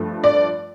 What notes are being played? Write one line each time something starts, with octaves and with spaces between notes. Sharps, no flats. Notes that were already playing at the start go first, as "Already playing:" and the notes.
Already playing: G2 F3 A3
D5